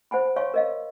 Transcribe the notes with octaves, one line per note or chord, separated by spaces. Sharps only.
C5 F#5 G#5 B5
C#5 F5 G#5 C6 C#6
A#4 D#5 F5